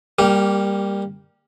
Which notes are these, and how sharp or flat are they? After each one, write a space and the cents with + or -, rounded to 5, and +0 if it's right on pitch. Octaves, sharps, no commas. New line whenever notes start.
G3 +15 A#3 +0 G4 -20